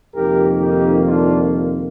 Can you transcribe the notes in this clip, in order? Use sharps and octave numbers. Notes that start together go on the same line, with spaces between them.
F2 C3 D#3 A#3 G4 A#4
D#4 G4
D4 F4